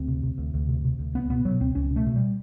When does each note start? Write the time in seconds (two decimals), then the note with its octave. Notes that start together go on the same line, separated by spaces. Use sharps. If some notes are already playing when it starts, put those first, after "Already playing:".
Already playing: D2 C4
0.08 C3
0.23 C3
0.38 D2
0.54 D2
0.69 C3
0.85 C3
0.99 D2
1.14 C#2 B3
1.30 B2 B3
1.45 B2 F#3
1.60 C#2 C4
1.75 C#2 C#4
1.91 B2
1.96 A3
2.07 B2
2.16 G3